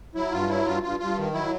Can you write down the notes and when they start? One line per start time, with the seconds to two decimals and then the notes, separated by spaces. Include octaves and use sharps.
0.15 F#3 E4
0.32 G2 F4
0.49 F#3 E4
0.66 G2 F4
0.83 G2 F4
0.99 G2 F4
1.18 D#3
1.34 F#3 E4